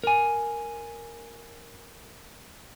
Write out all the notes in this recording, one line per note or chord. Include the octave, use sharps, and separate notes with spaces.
A#4 G#5